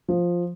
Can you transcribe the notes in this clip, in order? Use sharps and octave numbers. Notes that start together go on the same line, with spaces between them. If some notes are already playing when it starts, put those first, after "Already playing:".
F3